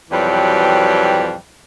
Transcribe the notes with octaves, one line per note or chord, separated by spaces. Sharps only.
F2 B2 E3 F#3 G3